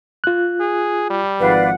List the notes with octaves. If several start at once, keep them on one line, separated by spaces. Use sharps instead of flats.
F4 F#6
G#4
G3
G#1 F3 B4 D5 F5 F#5